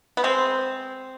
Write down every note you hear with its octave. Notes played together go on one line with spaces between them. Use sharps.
B3
G#3 C4